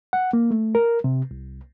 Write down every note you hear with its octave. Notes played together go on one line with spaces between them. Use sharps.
F#5
A#3
A3
A#4
C3
C2